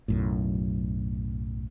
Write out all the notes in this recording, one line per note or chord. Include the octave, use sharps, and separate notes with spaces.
B1 F#2 A2